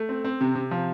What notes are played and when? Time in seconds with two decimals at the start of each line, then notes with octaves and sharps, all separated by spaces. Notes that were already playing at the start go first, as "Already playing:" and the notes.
Already playing: A3
0.09 C4
0.24 C4
0.41 C3
0.55 C3
0.71 F3